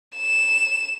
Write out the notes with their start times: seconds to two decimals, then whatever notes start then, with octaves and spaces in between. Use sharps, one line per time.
0.16 E7